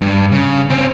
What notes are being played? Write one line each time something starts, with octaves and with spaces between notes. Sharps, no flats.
G2
C#3
C4 C#4